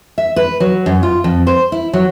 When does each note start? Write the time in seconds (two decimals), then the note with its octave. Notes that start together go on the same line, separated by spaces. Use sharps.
0.18 E5
0.36 B4
0.60 F#3
0.86 F#2
1.03 F4
1.24 F2
1.47 C5
1.72 E4
1.93 F#3